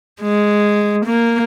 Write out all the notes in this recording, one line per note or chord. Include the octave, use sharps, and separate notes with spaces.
G#3
A#3